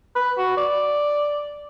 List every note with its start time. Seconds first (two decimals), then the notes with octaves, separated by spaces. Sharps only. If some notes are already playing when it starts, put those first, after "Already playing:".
0.16 B4
0.38 F#4
0.57 D5